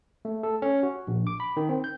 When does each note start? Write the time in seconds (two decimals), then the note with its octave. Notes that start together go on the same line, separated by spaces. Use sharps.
0.25 A3
0.43 A4
0.62 C#4
0.83 F#4
1.07 A#1
1.27 D6
1.40 B5
1.57 D#3
1.69 C4
1.84 G6